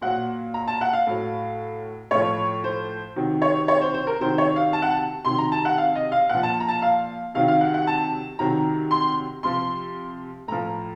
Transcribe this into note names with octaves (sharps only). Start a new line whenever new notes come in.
A#2 F#3 F#5
A#5
A5
F#5
F5
A2 F#3
A2 F3 C#5
C5
C3 D#3 F#3
C#5
C#5
C5
C5
A#4
C3 D#3 F#3 C5
C#5
F5
A5
F#5
A5
C3 D#3 F#3 C6
A#5
A5
F#5
F5
D#5
F5
A#2 F3 F#5
A5
A#5
A5
F5
C3 D#3 F#3 F5
F5
F#5
F#5
A5
C3 D#3 F#3 A#5
C6
C3 F3 C6
A2 F3 A#5